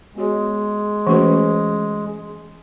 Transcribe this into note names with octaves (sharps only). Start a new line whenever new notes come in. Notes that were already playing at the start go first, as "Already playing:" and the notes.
G#3 B3 F#4 C#5
E3 A3 C#4 F#4 B4